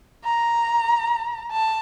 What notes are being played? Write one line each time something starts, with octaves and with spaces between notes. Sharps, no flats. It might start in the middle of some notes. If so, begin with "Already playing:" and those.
A#5
A5